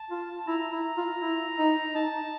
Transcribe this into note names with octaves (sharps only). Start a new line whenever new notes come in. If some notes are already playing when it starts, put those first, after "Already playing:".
Already playing: A5
F4
A5
E4 A#5
E4
F4
E4
D#4
D#4 A5